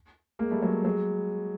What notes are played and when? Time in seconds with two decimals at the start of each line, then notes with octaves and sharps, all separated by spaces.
0.39 G#3 A#3
0.51 G3 A3
0.62 F#3 G#3
0.85 F#3 G#3